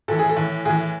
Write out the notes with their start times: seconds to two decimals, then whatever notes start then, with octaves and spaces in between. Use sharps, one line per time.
0.08 A2 E3 A4
0.19 G#4
0.29 A4
0.36 A2 E3
0.65 A2 E3 G#4